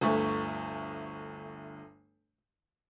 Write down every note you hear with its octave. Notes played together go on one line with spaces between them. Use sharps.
G1 D2 A3 C#6